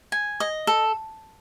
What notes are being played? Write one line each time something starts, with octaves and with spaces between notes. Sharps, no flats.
G#5
D#5
A4